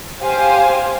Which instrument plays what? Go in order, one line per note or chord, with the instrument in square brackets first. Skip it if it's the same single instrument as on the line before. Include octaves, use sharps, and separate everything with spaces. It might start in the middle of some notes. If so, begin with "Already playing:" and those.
[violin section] G4 C5 F5 G#5